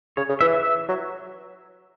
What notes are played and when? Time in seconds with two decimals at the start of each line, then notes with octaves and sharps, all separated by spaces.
0.17 C#3 C#5
0.29 C#3
0.41 E3 E5
0.53 E5
0.88 F#3